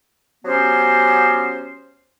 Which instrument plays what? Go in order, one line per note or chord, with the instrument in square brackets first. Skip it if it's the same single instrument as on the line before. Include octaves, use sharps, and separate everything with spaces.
[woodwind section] F#3 B3 C#4 G4 C5